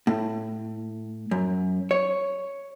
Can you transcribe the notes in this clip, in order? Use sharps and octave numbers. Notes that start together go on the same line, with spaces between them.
A2
F#2
C#5